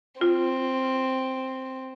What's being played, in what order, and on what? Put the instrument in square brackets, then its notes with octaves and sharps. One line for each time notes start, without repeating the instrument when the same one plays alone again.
[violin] C4 [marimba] F4